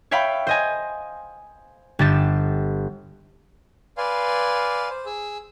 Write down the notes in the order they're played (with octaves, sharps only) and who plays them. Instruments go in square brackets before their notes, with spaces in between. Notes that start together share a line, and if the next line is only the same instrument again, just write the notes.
[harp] C#5 E5 F5 G5 B5
C5 D#5 G#5
G1 G4 A6 E7
[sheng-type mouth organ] B4 D5 F5 G#5 C6
C5
G#4 E6